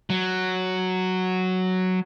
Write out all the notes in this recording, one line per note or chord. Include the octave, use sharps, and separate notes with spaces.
F#3